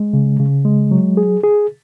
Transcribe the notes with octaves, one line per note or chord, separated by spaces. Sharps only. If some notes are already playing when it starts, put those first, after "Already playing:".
Already playing: G#3
C#3
C#3
G#3
F#3
G#4
G#4